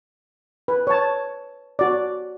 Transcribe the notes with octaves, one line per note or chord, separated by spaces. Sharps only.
B4
C#5 A5
F#4 D5